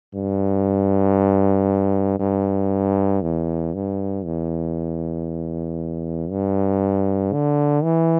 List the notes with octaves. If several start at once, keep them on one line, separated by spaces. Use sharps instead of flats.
G2
G2
E2
G2
E2
G2
D3
E3